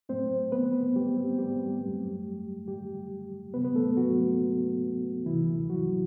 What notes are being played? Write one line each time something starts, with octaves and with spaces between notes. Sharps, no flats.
A2 F#3 A3 C4 C5
B3 B4
G3 G4
C4
G3 G4
F#2 F#3 A3
G3 G4
D2 C3 F#3 B3 B4
B3 B4
A3 A4
F#3 F#4
D2 C3 E3 G3 E4
F#3 F#4